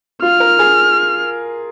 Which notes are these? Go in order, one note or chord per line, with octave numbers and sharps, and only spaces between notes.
F4 F6
A#4
G#4